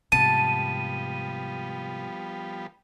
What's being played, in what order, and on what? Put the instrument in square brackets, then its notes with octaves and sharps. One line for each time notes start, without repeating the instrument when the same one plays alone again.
[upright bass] G#2 C3 [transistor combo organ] F3 G3 B3 [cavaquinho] A5 [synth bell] D#7